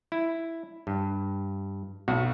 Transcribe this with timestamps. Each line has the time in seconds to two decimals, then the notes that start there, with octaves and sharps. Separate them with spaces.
0.12 E4
0.87 G2
2.08 B1 F#4